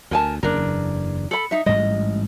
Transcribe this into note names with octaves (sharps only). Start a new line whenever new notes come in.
D2 A#4 G#5 A5
F#1 E2 D4 A#4
A4 B5
D#4 E5
A1 G#2 G3 D#5